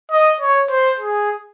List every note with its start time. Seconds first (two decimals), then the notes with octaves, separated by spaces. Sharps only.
0.11 D#5
0.41 C#5
0.70 C5
0.99 G#4